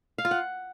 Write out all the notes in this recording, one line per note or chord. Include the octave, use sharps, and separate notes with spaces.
F5
F4
F#5